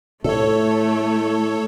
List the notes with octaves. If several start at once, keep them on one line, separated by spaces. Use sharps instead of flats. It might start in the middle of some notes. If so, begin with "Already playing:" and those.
A2 A3 A4 C#5